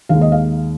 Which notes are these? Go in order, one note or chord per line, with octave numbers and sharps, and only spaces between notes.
D#2 D#3 G#3 F5
D#5
F5